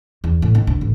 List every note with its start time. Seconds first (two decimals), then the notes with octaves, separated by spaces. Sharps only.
0.24 E2
0.42 A2
0.55 D#3
0.67 D2
0.81 A1